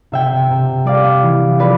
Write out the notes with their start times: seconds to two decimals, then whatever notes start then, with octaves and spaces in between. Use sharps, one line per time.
0.12 C3 E5 G5
0.51 C3
0.85 G3 D5 F5
1.23 E3
1.59 F3 B4 D5